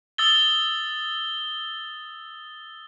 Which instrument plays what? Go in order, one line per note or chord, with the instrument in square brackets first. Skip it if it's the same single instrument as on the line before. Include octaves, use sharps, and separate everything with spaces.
[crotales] D#6 E6 A6 G7